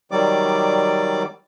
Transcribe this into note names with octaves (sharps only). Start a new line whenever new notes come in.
D#3 F#3 G3 D5 D6